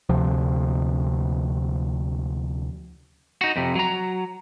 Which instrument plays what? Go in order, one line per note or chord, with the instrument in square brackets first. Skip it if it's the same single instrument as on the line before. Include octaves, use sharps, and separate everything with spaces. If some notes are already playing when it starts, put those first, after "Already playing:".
[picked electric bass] D2 C3 F3
[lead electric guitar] D#4 F#4
F2 C3
F#3 A#5